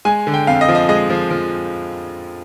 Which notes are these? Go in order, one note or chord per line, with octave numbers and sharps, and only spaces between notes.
G#3 G#5
D3
G5
F2 F5
D#5
F3
D#5
G#3 D#5
F3
F3